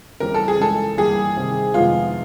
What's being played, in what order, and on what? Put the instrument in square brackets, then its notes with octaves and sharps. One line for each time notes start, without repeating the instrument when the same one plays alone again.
[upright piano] C#3 E3 G3 C4 [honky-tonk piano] A#4
[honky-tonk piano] A4
G#4
[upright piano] C#2 C#3 E3 G#3 [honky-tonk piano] A4
[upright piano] G2 E3 G3 A#3 [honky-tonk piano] G#4
[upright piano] C3 D#3 G3 C4
[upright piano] F2 C3 D#3 G#3 B3 [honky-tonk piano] F4